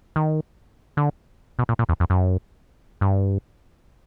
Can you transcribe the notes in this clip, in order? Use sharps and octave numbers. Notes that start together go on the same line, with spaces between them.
D#3
D3
B2
A#2
A#2
E2
F2
F#2
G2